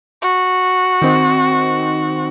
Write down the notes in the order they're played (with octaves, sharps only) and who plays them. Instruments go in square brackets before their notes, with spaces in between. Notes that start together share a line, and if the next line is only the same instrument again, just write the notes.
[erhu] F#4
[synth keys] D#3 C4 D#4